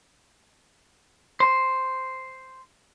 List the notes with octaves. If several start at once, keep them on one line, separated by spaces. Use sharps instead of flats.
C5